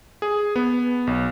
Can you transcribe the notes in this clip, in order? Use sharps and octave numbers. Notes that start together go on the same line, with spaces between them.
G#4
B3
B1